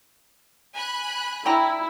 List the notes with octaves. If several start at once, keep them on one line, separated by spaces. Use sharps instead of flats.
G#5 B5 F#6
D3 E4 G5 A#5